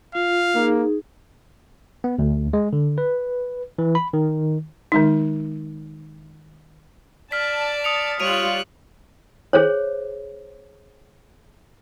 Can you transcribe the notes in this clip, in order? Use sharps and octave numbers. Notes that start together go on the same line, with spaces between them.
F4 F5
A#3 D#4 G#4
B3
D2
G#3
D3
B4
E3
B5
D#3
D#3 G#3 D#4
D5 A5 F6 B6
D#6 C#7 F7
G3 F4 C#5 F#6 D7 D#7 F7
G#4 C5 C#5